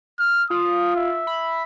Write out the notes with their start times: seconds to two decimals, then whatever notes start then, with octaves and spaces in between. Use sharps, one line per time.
0.19 F6
0.50 F4 D#6
0.96 E5
1.27 B5